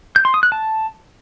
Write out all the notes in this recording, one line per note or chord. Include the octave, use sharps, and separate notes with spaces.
G6
C6
D#6
F#6
A5